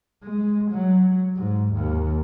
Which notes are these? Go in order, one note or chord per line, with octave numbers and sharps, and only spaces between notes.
G#3
F#3
G#2
D#2